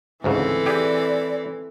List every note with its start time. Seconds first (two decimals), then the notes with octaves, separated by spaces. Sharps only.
0.24 D2 G#2 C#3 E3 C4 A4
0.66 G4 G#4 D5